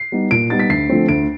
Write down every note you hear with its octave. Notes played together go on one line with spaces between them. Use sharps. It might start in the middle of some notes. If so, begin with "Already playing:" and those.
Already playing: C7
G3 B3 D#4
A#2 D7
G3 B3 D#4 A6
B6
D2 C7
D3 F3 A3 C4
D2 D7